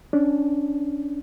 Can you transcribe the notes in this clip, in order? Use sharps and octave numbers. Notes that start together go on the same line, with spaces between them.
C#4 D4